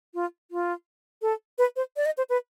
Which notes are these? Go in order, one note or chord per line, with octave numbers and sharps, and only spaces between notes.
F4
F4
A4
B4
C5
D5
D#5
C5
B4